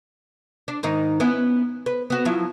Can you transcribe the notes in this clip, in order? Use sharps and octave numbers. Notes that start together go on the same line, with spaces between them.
D4
G#2 D#3 D#4
B3 C#4 E4
B4
B3 F#4
F3 F#3 E4